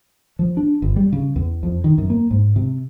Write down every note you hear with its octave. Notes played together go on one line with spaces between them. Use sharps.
F3
D4
G1
G3
C#3
E2
F2
D#3
F#2
A#3
G#2
C3